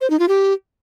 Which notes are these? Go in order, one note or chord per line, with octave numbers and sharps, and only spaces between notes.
C5
D#4
F4
G4